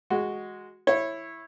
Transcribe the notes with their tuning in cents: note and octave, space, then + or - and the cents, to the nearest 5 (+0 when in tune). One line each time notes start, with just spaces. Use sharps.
G#3 +0 F#4 +0
E4 +0 C#5 -20